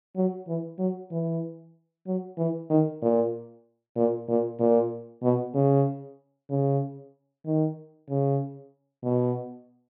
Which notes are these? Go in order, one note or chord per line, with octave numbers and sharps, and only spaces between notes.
F#3
E3
F#3
E3
F#3
E3
D#3
A#2
A#2
A#2
A#2
B2
C#3
C#3
D#3
C#3
B2